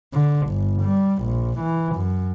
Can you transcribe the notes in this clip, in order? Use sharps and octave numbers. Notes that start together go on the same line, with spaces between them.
D3
G1
G3
A#1
E3
F#2